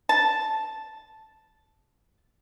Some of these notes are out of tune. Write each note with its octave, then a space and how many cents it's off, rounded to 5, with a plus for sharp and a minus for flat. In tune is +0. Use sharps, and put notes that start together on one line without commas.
A5 -5